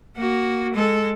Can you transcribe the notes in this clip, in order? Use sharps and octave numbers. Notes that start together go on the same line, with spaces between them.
A#3 F#4
G#3 A4